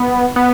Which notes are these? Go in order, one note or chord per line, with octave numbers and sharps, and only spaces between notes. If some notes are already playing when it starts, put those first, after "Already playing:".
Already playing: B3
B3